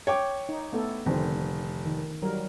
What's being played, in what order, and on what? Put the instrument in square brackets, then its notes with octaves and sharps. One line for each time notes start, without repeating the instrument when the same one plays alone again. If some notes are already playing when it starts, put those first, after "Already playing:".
[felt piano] C#5 G5 D6
[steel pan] D#4
A3 B3 A4
[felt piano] F1 [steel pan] D3 D#3 C4
[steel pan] D#3
F#3 G3 A#4